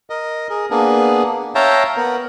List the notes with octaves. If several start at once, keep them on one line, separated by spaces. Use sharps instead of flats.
A#4 D#5
G#4 A#4
A#3 B3 D4 G#4
C#5 E5 F5 G5 A5 A#5
B3 A#4